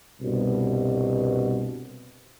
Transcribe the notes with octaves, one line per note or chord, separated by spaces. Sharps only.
C2 G2 B2